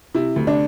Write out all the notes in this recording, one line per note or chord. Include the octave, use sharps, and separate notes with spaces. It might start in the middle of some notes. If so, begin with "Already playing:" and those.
C3 E4
D2
D4